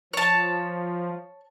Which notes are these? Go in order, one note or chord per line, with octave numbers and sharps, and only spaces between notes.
F3 C#5 A5